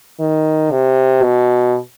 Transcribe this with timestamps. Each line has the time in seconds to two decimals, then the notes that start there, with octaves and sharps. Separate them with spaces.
0.20 D#3
0.71 C3
1.23 B2